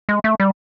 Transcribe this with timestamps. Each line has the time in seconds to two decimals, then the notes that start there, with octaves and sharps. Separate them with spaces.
0.09 G#3
0.24 A3
0.40 G3